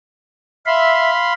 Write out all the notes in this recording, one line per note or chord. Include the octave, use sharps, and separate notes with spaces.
E5 F5 B5 C6